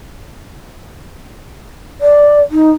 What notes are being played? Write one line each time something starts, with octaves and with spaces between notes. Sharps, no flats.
D5
D#4